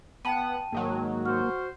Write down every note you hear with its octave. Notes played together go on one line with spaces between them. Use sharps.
B3 F#5 G5 A5 D#7
G#2 D#3 F#3 A#3
F#4 C5 F6